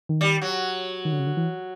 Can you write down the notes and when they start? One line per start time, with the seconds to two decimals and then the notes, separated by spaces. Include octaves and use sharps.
0.09 D#3
0.21 G3
0.42 F#3
1.05 D#3
1.12 D3
1.19 C#3
1.26 D3
1.37 E3